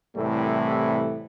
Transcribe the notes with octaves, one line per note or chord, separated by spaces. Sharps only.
C2 A2 C3 E3 G3 A3